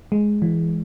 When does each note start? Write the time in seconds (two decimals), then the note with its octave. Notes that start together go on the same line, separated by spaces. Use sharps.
0.12 G#3
0.42 E3